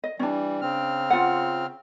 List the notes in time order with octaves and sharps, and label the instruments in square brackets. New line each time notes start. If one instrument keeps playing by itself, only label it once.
[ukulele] D#5
[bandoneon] E3 G3 [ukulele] C#4 D4
[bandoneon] C#3 C4 F6
[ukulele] F4 F#5